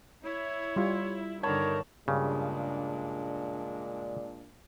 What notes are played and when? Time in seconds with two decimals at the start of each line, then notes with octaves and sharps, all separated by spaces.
0.24 E4 C#5
0.76 G3 F4
1.43 G2 D3 D#3 A#4 C#5 A5 B5
2.08 G2 A#2 C#3 G#3 D4